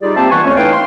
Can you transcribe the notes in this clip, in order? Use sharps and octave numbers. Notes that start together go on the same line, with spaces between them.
G3 D#4 F4 G4 G#4 D5
A#3 C4 G4 C5 E5 A5
E3 B3 F4 B4 G#5 C#6
F2 A3 C#4 C#5
D#4 E4 B4 F5 G5
C6